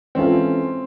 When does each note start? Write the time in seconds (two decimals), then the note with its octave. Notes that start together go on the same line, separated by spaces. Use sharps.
0.15 E3 G#3 C4 C#4 F4 A4